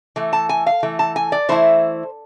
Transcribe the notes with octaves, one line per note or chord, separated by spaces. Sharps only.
E3 A3
A5
G#5
F5
E3 A3
A5
G#5
D5
E3 A3 E4 C5